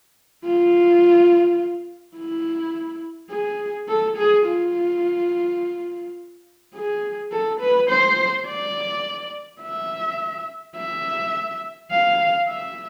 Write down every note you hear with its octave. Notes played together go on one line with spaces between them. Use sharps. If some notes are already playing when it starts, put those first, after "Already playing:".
F4
E4
G#4
A4
G#4
F4
G#4
A4
B4
C5
D5
E5
E5
F5
E5